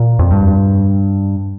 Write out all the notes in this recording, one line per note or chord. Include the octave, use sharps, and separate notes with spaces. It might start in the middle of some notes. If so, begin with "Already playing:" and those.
Already playing: A#2
F2
G2